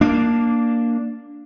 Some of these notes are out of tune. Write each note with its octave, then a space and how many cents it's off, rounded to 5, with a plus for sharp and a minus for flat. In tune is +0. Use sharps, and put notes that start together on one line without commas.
A#3 +0 D4 +0